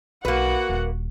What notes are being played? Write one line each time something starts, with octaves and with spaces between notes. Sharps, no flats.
B1 A#3 F#4 B4 F#5
D#1